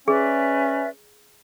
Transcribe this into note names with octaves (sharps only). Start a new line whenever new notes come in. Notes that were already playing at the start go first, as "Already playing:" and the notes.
C#4 G#4 B4 D5 E5